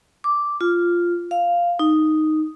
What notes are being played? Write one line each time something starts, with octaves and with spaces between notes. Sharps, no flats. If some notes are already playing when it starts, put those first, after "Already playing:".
D6
F4
F5
D#4